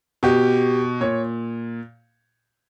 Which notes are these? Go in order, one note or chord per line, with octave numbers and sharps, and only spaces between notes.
B2 G4
A#2 C#5